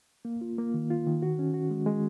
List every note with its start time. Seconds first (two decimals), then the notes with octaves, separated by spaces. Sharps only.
0.25 A#3
0.41 F4
0.58 A#3
0.74 D#3
0.90 F4
1.07 D#3
1.22 F#4
1.39 C#4
1.54 F#4
1.70 G#3
1.86 G#3